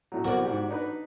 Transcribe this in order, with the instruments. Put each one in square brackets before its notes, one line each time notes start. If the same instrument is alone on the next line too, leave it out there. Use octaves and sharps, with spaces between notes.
[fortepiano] A2 F#3
[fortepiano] C2 B3 A#4 [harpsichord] F#4 D5
[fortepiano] G#2 G4
D4 D#4 B4